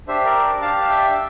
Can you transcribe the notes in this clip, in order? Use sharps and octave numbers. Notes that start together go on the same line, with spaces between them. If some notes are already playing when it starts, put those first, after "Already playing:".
D4 G4 C5 E5
A#4 D5
D4 G4 F5 A5
F5
E5 G5